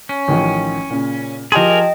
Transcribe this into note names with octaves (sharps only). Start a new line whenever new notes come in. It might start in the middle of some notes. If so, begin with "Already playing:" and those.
C#4
A1 D#3 F3
A#2 C#3
F3 G4 G#4 A#4 D#5 G5 A5 C6
D#5